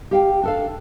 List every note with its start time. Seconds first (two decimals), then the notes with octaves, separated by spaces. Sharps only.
0.11 G4 F5 G5
0.43 D4 A4 F5